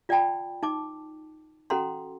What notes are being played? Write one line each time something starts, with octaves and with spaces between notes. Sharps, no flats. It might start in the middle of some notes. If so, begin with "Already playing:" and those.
F4 D5 F#5 G5 A5 B5
D#4 A5 D6
C#4 F#4 A4 F#5 A#5 C6